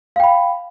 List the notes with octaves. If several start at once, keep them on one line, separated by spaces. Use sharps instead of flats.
F5 G5 B5